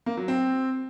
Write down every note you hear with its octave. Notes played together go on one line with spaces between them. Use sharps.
A#3
F#3
C4